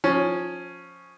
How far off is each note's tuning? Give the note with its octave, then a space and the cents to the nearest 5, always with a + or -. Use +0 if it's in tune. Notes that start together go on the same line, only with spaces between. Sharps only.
F3 +20 C#4 +0